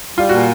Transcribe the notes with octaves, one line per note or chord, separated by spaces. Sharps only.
G3 F4
A#2 F#4